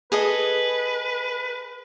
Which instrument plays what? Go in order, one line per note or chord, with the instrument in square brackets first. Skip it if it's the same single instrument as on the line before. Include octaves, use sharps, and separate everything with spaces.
[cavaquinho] G#4 A4 D#5 [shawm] B4